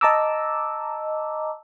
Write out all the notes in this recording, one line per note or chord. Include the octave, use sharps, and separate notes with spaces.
D#5 A5 A#5 D6 E6